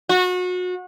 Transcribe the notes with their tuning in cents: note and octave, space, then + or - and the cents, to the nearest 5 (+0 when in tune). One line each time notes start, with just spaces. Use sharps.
F#4 -30